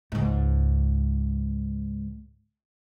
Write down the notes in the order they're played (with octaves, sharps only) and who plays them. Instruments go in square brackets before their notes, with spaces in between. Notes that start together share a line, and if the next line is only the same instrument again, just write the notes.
[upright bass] C#2 G#2